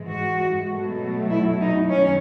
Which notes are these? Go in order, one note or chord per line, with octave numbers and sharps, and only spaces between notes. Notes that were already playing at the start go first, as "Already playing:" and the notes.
Already playing: G#2 E3 G#3
F#4
B2 F#3 A3
E4
D#4
F#2 D#3 C#4